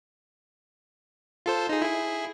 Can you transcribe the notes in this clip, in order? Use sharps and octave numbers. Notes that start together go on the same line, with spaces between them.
F4 A4 C5
D#4 G#4
E4 G#4